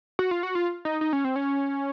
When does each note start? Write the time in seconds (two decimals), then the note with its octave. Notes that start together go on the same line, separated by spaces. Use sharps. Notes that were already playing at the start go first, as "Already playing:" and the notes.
0.19 F#4
0.31 F4
0.43 F#4
0.55 F4
0.85 D#4
1.01 D#4
1.13 C#4
1.24 C4
1.36 C#4